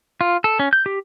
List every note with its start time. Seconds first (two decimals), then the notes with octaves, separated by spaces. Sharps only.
0.21 F4
0.44 A4
0.59 C#4
0.73 G6
0.86 G4